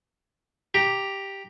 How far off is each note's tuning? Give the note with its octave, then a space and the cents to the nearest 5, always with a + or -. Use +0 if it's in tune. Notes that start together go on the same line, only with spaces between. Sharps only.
G4 +0 A#5 +0